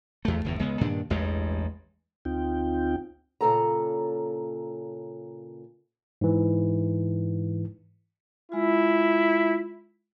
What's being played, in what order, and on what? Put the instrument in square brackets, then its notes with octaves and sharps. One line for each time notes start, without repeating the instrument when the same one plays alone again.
[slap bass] E2 A3
G1 E2 A2
C#2 G#3 B3
G2 A#2 D#3 D4
A1 E2 G2 G#3
[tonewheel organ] D2 C4 D#4 F4 G5
[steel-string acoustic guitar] A#2 C#3 A4 A#5
[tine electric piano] G#2 E3
[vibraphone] G#3 F4 [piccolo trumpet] E4